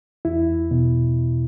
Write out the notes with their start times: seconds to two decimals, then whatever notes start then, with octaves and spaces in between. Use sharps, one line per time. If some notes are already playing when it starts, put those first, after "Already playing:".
0.25 E2 E4
0.71 B2